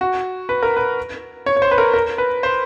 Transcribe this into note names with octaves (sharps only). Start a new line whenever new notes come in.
F#4
B4
A#4
B4
C#5
C#5
C5
B4
A#4
A#4
B4
C5